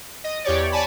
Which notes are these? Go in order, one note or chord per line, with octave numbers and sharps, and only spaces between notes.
D#5
E2 G4 C#5 D5
C#5 D5 G#5 A5 B5